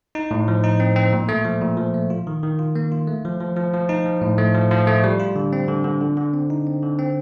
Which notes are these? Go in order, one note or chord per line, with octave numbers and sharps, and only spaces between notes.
D#4
A2
F3
D#4
C4
C4
A#2
A3
F3
A#2
F3
A3
F4
D#3
D#3
F4
A#3
F4
A3
F3
F3
F3
F3
D#4
F3
A2
A3
F3
F3
A3
G3
F4
D3
C4
D3
D3
D3
D3
C4
D#4
C4
D3
C4